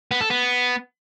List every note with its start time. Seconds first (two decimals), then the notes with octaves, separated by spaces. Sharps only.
0.11 B3
0.21 A4
0.30 B3